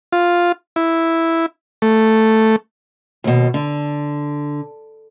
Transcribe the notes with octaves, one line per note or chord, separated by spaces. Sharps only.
F4
E4
A3
D#2 B2
D3